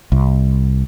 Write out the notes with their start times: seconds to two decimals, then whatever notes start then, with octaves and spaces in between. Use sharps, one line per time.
0.12 C2